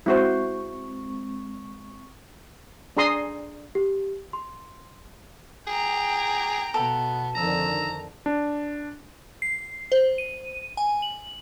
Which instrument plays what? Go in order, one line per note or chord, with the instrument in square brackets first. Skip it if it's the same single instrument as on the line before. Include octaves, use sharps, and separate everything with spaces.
[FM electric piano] G#3 C4 C#6 [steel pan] E4 F#4 C5
[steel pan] D4 G#4 A#5 C6 D#6
[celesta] G4
C6
[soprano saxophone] G#4 [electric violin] G5 A#5
[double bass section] B2 [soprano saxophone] B3 [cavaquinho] A4
[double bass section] F2 D3 D#3 [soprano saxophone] A#5 [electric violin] E6
[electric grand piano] D4
[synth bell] C7
C5
D#7
G#5
F#7